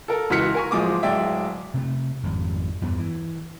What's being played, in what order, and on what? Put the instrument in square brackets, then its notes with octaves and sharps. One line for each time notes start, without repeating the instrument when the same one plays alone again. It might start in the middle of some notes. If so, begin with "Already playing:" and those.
[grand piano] A4 A#4
C#2 E3 F#4 F6 B6 C#7
A#4 G#5 C#6
D1 F3 G#3 D6 D#6
D1 G#3 D5 E5 G5
[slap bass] C3 A3
G#1 F2 G3
E2 G2 G3 B3
E3